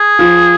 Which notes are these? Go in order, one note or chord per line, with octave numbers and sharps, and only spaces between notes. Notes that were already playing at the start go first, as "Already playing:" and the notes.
Already playing: G#4
F3